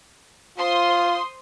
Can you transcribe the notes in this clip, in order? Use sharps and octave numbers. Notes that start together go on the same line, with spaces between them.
F4 C5 C6 D#6